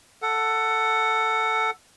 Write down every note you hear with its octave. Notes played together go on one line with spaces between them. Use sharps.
A4 F#5